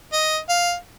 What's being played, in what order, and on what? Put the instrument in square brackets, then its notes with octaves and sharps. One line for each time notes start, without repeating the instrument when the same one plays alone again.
[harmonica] D#5
F5